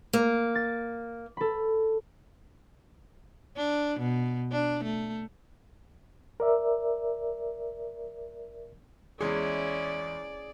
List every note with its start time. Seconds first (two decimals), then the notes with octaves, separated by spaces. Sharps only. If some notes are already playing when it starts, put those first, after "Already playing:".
0.13 A#3
0.55 A6
1.37 A4 B5
3.57 D4
3.99 B2
4.52 D4
4.84 A3
6.40 A#4 D5 E5
9.21 E2 G#3 C#4 E4 G#4 D5